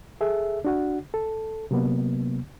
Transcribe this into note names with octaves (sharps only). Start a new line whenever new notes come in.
G#4 A4 E5
D4 F#4 F#5
A4
C3 F#3 A#3 B3